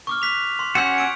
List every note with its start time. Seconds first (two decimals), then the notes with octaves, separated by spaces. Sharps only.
0.07 C#6 D6 F6
0.22 F#6 B6 F7
0.59 C6
0.75 C#4 F#4 C6 E6 G6
0.98 E6 D7